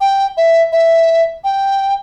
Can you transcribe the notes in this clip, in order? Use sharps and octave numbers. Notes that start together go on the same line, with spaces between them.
G5
E5
E5
G5